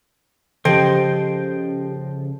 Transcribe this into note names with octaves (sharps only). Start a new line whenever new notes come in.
C#3 F3 G4 A4 C5 D#5 G5